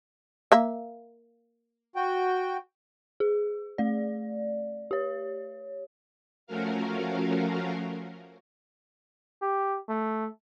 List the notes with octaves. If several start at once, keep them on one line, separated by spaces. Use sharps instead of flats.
A#3 E5
F#4 G5
G#4
A3 D5
G4 C#5
F3 A3 C#4 F#4 A#4 F5
G4
A3